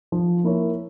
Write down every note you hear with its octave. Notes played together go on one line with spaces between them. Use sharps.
F3
A#3 E4 A#4 C#5